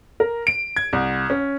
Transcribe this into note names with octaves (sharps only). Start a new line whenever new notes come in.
A#4
D7
G#6
C2
C#4